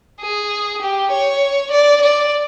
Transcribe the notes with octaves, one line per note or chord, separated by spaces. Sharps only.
G#4
G4
C#5
D5
D5